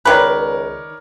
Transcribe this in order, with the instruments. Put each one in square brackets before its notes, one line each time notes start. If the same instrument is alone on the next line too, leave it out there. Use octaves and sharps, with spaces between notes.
[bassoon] C#2 [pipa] D#3 B4 [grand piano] A#4 C#5 D5